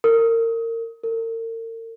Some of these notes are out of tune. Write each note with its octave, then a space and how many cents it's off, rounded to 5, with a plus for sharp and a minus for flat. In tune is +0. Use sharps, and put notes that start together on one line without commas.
A#4 -30
A#4 -45